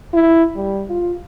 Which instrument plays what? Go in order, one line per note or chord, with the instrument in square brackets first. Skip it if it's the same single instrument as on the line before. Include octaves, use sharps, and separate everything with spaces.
[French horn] E4
G3
F4